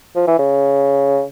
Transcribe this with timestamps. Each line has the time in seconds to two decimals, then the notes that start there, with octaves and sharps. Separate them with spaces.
0.16 F3
0.28 E3
0.39 C#3